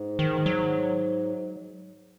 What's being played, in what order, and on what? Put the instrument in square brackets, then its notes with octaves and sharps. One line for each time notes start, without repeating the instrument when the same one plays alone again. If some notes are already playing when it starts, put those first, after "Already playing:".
Already playing: [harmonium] G#2
[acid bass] D#3
F#3